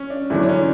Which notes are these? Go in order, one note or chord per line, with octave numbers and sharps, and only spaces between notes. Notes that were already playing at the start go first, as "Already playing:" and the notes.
Already playing: C#4
D4
E2 D3 F#3 E4
D4
C#4